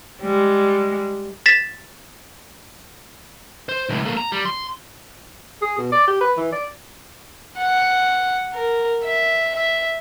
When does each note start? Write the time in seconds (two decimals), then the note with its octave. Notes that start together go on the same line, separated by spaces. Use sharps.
0.21 G3 G#3
1.46 A6 B6 E7
3.69 C5
3.89 C#2 A2
4.05 A#3 A4
4.17 A#5
4.32 G3
4.45 C6
5.62 G#4
5.78 B2
5.92 D5
6.07 G4
6.21 B4
6.37 E3
6.52 D5
7.59 F#5
8.54 A#4
9.03 E5
9.55 E5